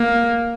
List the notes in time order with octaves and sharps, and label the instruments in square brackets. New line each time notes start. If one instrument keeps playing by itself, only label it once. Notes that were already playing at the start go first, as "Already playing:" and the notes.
Already playing: [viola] A#3